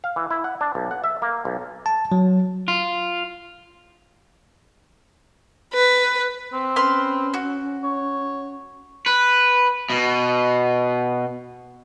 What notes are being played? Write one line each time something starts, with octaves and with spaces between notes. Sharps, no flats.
F5
E3
E4
F#5
D4
B1
F#5
E5
A#3
B1
A5
F#3
F4
B4
C4
C#4 B4 C6 F6
F#4
C#5
B4
B2